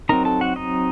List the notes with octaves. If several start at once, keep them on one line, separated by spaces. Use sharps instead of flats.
F#3 C4 D#4 A#4 A#5
A4 A5
F#4 F#5
D#4 D#5